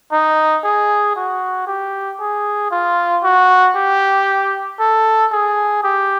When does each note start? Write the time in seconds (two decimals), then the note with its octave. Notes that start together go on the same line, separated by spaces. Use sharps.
0.12 D#4
0.64 G#4
1.16 F#4
1.67 G4
2.20 G#4
2.71 F4
3.23 F#4
3.76 G4
4.79 A4
5.32 G#4
5.83 G4